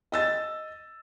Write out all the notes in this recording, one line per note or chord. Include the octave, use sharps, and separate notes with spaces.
D#5 E6 A6